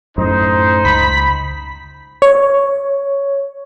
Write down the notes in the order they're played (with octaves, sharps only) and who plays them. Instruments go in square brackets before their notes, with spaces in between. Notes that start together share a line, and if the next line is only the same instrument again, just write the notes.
[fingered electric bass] F#2 A2 [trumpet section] D#4 C5
[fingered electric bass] C#2 [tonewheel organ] B5
[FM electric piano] C#5